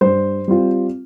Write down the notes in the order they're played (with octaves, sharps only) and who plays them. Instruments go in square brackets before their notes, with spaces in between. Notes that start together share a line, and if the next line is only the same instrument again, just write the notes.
[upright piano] G2 C5
G3 C4 F4